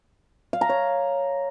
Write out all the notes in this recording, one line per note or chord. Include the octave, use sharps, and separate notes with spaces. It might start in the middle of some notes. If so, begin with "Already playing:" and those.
F5
A#5
C#5